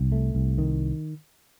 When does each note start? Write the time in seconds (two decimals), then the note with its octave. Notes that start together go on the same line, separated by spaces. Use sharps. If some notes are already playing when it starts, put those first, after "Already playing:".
Already playing: C2
0.12 A3
0.35 C2
0.58 D#3